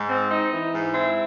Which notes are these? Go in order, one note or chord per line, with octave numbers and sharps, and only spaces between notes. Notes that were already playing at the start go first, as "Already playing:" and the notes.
Already playing: G#2
C4
D#4
E3
G#2
C4 E4